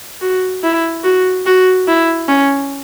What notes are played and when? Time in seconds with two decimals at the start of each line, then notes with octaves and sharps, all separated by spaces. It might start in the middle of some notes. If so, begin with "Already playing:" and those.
0.21 F#4
0.63 E4
1.04 F#4
1.46 F#4
1.87 E4
2.28 C#4